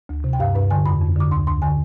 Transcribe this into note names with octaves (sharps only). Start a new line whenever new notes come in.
D2
C3
G5
G2 F5
G2 B4
D3 G#5
F2 B5
F2
D3 D6
D2 C6
D2 C6
D3 G#5